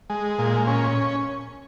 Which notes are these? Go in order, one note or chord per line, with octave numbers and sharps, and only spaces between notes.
G#3
A#2
C#4